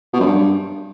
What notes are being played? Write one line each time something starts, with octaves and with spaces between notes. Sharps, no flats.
B2
F#2
G2